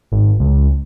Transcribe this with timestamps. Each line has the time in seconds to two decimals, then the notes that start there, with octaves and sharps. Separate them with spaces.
0.12 G#1
0.40 C#2